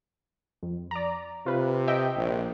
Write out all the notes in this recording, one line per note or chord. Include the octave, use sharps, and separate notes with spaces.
F2
D5 A#5
C3 F4 B4
D#5 E5 G5
A#1